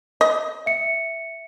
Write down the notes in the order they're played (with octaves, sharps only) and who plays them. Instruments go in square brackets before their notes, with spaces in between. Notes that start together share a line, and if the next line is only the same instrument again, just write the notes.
[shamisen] D#5
[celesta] E5 C#7